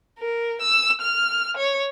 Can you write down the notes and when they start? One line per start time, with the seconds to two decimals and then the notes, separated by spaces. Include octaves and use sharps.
0.19 A#4
0.61 E6
1.01 F6
1.57 C#5